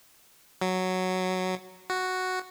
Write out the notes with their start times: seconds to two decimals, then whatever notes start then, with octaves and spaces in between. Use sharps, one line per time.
0.61 F#3
1.90 F#4